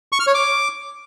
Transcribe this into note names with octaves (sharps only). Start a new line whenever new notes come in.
C#6
F6
C#5
D6